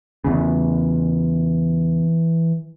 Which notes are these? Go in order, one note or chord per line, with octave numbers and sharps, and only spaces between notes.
E2 C#3 E3